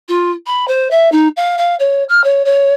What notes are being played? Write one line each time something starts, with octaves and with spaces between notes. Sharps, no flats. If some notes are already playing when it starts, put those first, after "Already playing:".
F4
B5
C5
E5
D#4
F5
F5
C#5
F6
C#5
C#5